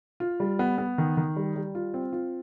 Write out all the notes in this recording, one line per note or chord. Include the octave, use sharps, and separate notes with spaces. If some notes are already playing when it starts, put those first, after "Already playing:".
F4
G3
B3
B3
D#3
D#3
G3
G3
F4
C4
F4